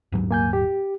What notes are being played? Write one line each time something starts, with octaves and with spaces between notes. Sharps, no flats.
D#1 G#2 F#3
A#3 G#5 G6
G4